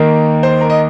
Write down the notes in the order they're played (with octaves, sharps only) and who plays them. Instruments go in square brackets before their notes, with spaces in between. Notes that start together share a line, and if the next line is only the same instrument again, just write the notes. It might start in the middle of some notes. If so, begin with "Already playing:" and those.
Already playing: [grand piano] D#2 D#3 A#3 A#4
C5
A#4
D#5